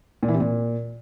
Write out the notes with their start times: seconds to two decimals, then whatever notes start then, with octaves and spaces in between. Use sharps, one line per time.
0.23 A#2
0.28 E3
0.34 C3
0.40 A#2